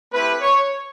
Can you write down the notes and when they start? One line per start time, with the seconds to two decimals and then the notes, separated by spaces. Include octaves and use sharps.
0.13 A3 C4 E4 G4 B4
0.41 C#5